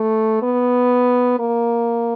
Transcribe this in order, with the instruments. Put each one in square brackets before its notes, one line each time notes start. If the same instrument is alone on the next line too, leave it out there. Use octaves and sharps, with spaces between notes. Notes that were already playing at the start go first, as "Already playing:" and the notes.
Already playing: [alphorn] A3
B3
A#3